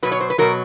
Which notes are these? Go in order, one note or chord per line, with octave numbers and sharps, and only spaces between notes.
B2 F#3 B4
C#5
C5
B4
B2 F#3 A#4